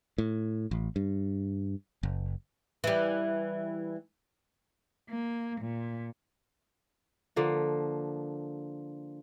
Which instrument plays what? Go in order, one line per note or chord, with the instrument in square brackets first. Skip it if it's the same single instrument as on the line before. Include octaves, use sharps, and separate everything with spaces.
[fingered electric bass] A2
A1
G2
F#1
[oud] E3 G3
[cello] A#3
A#2
[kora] D3 F3 A#3